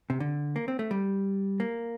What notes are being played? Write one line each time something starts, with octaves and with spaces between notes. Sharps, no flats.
C3
D3
A#3
C4
A3
G3
A#3